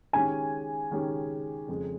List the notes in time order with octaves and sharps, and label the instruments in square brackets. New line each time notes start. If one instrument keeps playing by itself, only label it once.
[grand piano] D#3 G#3 C#4 G4 [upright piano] G#5
[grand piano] D#3 G#3 C#4 G4
F2 C#3 G#3